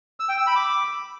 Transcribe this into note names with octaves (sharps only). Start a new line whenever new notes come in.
E6
G5
E6
B5
D6